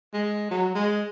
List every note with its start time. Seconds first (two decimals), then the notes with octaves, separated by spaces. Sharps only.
0.13 G#3
0.51 F#3
0.75 G#3